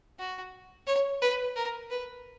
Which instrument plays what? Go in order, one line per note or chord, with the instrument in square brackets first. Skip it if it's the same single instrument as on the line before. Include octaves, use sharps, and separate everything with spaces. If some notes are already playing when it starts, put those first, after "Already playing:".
[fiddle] F#4
C#5
B4
A#4
B4